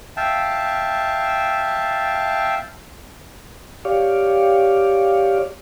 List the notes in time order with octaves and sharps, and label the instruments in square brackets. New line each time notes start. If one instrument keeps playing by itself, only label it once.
[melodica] E5 F5 G5 A5
[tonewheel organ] G4 C#5 D5 F5